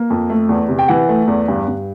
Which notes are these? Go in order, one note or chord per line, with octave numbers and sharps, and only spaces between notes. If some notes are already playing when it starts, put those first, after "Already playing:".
Already playing: A#3
F2
A3
E2
C3
G5
E3 F#5
A3
E2
G2
G2